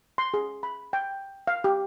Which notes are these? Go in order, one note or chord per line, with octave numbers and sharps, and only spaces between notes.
C6
G#4
B5
G5
F5
G4